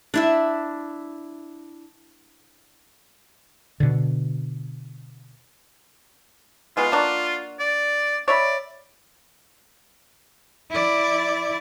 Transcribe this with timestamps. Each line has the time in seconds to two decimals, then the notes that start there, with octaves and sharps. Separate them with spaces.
0.14 D4 E4 E5
3.80 B2 D3
6.77 B2 G#3 B3 F4
6.92 A#3 D4 F#4
7.59 D5
8.28 C#5 D5 E5 B5
10.70 E4 D5